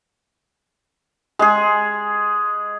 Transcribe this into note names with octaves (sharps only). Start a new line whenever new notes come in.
G#3 G#4